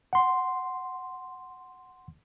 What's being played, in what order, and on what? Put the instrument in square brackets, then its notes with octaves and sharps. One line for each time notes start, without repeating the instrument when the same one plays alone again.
[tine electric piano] F#5 C6